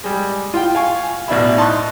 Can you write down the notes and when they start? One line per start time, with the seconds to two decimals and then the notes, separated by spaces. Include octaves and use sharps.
0.04 G3 G#3
0.54 F4 G5
0.75 F5 G#5 C#6
1.28 A1 B2 D4 E4 E5 B5
1.57 D#4 A5 C6 C#6 F#6